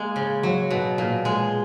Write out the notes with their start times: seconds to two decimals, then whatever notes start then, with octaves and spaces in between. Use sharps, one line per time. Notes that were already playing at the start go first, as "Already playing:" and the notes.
Already playing: G#3 A#3
0.16 C#3
0.43 F#3
0.70 B2
0.98 A#2
1.25 G#3